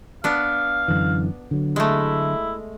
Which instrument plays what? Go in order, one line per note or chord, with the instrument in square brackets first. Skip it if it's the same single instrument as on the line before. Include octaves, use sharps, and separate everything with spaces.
[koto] B3 D4 [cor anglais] F5
[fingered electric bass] F#2 D3 E3
D3 F#3
[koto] G#3 A3 [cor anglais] E4